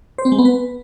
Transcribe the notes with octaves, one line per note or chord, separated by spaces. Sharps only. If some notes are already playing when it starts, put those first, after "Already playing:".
C5
C4
G#3
B3
B4